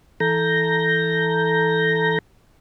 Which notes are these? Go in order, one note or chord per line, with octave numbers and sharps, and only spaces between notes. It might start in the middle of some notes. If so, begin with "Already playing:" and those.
E3 A4 A#5 G6 A#6